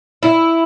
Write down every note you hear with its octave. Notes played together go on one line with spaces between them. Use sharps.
E4